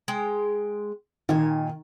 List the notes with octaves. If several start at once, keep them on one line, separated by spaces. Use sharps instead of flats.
G#3 G5
A#2 D#3 G#5